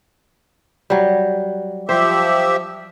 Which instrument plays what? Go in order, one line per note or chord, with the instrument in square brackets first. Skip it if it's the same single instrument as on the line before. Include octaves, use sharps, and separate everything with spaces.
[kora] F#3 G3
[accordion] F3 G4 E5 [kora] C5